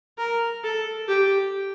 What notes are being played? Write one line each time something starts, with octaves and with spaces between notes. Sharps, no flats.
A#4
A4
G4